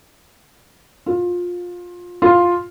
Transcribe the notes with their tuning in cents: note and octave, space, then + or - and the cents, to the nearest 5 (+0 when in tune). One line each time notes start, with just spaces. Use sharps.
F4 +20
F4 +5